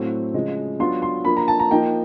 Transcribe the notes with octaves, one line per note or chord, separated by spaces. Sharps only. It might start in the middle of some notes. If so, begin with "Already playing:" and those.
Already playing: A2 F#3 A3 C4
C#3 F3 G#3
F#3 B3 D4 F4 C6
C6
F3 A#3 D4 B5
A#5
A5
A#5
F3 A#3 D#4 G5